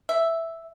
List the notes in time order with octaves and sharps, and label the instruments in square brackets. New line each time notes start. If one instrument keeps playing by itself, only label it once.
[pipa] E5